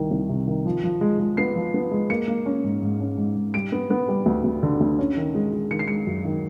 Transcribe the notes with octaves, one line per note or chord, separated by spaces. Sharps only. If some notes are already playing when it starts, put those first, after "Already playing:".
Already playing: C2 D#3
C2
C3
D#3
F3
F3
G#3
G#3
B3 C7
F3
B3
G#3
A#3 C#7
A#3
C#4
G#2
G#2
C#4
G#2
G#2
G3 D7
B3
B3
G3
D2
D2
D3
D2
C#4
D#3
G#3
G#3
D#3 C#7
C7
G#3 C#7
F#2
D#3